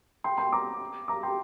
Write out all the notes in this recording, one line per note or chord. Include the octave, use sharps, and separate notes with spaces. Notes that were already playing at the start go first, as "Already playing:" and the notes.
G5 C6
G5 C6
A#5 D6
A#5 D6
G5 C6